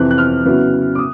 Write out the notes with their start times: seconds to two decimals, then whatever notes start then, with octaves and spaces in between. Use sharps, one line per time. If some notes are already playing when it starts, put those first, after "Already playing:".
Already playing: F2 C3 E3 F#6
0.11 F#6
0.18 F6
0.45 C#3 F#3 B3 E4
0.95 D6
0.99 D#6